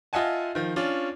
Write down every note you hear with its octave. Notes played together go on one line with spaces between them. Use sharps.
F4 D#5 E5 F#5 G#5 A5
D#3 F3
C#4 D4 F4